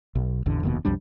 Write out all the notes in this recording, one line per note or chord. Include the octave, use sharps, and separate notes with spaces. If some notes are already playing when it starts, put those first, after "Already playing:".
B1
A1 E2 D3
F1 D#2 B2
B1 F2 G3 D4